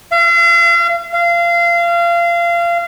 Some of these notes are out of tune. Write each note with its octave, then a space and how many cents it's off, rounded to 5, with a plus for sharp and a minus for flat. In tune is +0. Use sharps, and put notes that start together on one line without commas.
F5 -40
F5 -25